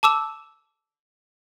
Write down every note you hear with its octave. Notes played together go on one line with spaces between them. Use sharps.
A5 D6 E6 E7